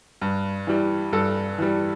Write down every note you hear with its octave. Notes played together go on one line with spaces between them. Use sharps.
G2
E3 G3
G2 A4
E3 G3